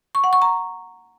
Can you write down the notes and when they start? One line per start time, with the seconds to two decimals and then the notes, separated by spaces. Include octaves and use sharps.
0.15 C#6
0.24 F#5
0.33 C#6
0.42 A#5